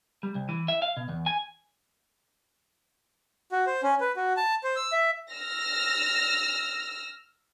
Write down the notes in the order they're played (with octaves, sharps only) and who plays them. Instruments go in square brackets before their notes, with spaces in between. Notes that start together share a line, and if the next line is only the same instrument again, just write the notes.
[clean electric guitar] G3
C2
E3
E5
F5
B2
E2
G#5
[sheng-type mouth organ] F#4
C5
C#4
B4
F#4
A5
C5
E6
E5
[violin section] E6 F6 A#6